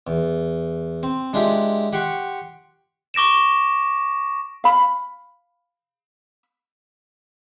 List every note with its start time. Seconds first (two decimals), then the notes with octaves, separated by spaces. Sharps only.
0.07 E2
1.03 C4
1.33 G#3 D4 E4 F4 G4
1.93 G4 F#5 G5 C6 C#6
3.14 C#6 D6 A#6 D7 E7
4.64 F5 B5